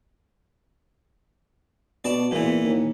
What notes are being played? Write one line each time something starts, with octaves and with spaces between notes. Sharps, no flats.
B2 D5 A5
E2 A#2 E3
D#2